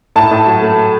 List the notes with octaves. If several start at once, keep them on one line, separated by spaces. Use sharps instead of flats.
A2 A5
A2
F#3
A3